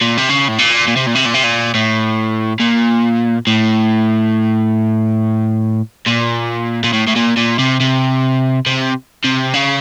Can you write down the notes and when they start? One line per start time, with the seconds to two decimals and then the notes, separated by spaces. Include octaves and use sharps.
0.02 A#2
0.17 C3
0.29 C#3
0.48 A2
0.58 A#2
0.88 A#2
0.97 C3
1.07 A#2
1.15 C3
1.26 A#2
1.34 C3
1.44 A#2
1.74 A2
2.60 A#2
3.47 A2
6.06 A#2
6.84 A#2
6.93 A2
7.07 A2
7.16 A#2
7.37 A#2
7.59 C3
7.80 C3
8.67 C3
9.24 C3
9.54 C#3